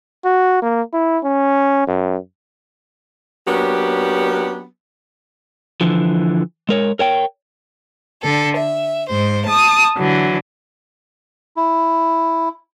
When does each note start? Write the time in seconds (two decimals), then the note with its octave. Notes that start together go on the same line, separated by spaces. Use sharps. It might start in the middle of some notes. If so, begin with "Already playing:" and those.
0.25 F#4
0.62 A#3
0.94 E4
1.24 C#4
1.88 F#2
3.47 F#3 A#3 B3 C#4 D4 G4
5.81 D3 E3 F3
6.69 G#3 A#4 C#5
6.99 A#4 C#5 G5
8.21 D3 A4
8.56 E5
9.08 G#2 C5
9.45 A5 D#6
9.96 D3 E3 F#3
11.57 E4